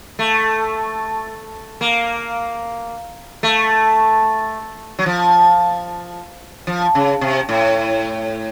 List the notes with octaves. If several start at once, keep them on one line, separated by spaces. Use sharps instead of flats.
A3
A#3
A3
F#3
F3
F3
C#3
C3
A2